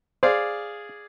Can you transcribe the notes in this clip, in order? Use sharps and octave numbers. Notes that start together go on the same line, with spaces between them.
G#4 C5 D5 F5